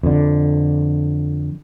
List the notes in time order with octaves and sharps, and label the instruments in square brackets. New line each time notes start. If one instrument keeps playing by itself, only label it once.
[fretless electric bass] F2 D3